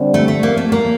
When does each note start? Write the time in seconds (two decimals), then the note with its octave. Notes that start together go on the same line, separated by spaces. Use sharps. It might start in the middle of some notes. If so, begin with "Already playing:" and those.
Already playing: D3 G3 C4
0.14 A3
0.28 A3
0.43 A#3
0.57 A3
0.72 A#3